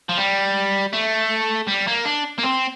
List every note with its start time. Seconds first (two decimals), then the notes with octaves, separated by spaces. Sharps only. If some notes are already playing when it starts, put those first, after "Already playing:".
0.09 F3
0.18 G3
0.93 A3
1.67 G3
1.87 A#3
2.05 D4
2.38 A#3
2.43 C4